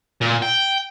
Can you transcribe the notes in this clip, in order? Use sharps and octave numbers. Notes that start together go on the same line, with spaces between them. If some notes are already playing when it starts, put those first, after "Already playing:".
A#2
G5